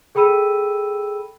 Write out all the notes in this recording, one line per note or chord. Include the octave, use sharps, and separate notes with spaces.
G#4 A4 G5 B5 E6 D#7